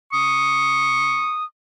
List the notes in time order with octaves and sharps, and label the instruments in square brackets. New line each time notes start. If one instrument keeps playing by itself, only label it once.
[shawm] C#6 [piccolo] D#6